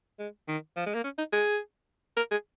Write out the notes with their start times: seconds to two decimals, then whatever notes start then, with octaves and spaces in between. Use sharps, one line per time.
0.19 G#3
0.48 D#3
0.76 F3
0.86 G#3
0.94 A#3
1.04 C#4
1.18 D#4
1.33 G#4
2.17 A#4
2.31 G#4